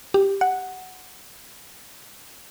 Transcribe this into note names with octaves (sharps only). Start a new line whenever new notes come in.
G4
F#5